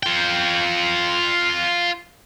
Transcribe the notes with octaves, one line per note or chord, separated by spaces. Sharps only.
F4 G5